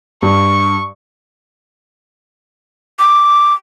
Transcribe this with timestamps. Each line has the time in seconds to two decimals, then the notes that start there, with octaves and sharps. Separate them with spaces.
0.23 G2 C#6
2.99 D6